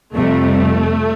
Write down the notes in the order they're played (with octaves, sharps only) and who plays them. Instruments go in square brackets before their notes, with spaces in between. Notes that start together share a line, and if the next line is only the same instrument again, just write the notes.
[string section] F2 C3 G3 A3